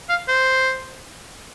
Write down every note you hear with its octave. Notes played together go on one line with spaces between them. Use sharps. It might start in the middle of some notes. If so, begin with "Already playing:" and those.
F5
C5